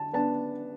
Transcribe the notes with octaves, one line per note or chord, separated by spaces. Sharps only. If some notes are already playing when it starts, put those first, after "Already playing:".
Already playing: D3 A5
B3 D4 A5